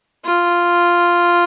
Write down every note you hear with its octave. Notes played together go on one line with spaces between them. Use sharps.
F4